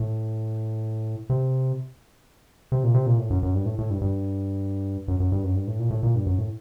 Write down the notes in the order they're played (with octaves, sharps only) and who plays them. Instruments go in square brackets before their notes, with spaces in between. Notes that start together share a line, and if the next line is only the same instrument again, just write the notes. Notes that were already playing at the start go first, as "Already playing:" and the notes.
Already playing: [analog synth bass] A2
C3
C3
A#2
C3
A#2
A2
F#2
F#2
G2
A2
A2
G2
G2
F#2
F#2
G2
F#2
G2
A2
A#2
A2
A#2
G2
F#2
A2